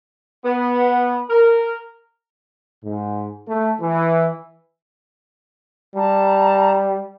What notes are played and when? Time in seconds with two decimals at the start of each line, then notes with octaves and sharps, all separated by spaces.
0.45 B3
1.30 A#4
2.84 G#2
3.48 A3
3.80 E3
5.95 G3 A5 A#5